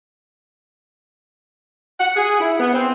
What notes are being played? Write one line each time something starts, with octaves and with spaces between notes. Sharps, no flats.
F#5
G#4
E4
B3
C4